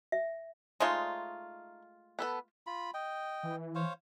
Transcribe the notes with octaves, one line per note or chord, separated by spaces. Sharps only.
E5
G#3 A3 D#4 F4 C#5 D#5
B3 A4 B4
F4 B5
D#5 G5
E3
C5 C#5 F5